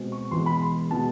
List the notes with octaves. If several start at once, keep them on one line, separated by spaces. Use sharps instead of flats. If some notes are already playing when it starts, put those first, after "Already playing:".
Already playing: B2 G#3 C4
C#6
E2 B2 G#3 B3 C6
B5
C6
B2 G#3 B3 A5